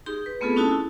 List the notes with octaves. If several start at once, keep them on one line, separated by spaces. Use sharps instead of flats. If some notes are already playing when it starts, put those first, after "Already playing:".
D#4 G4 G#4 C6
B4
A3 B3 C4 F4 G#4 A4
C#4 D#4 E4 F#4 A4 A5
E4 F#4